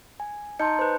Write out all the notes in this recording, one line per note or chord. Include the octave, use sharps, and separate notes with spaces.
G#5
D#4 D#5 A5 C6 G6 C#7
B4 C5